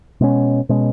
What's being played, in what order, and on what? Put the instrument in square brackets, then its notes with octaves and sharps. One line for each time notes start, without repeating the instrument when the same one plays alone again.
[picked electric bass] B2 G#3 C#4
B2 G#3 C#4